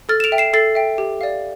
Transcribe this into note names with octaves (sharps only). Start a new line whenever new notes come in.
A4 F6 A6
E7
D7 F7
E5 G5
C7 E7
A4 A6 C7
E5 G5
G4
D5 F5